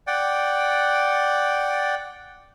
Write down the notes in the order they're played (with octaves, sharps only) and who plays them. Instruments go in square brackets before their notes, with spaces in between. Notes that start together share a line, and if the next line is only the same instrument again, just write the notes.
[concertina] D5 F#5 G5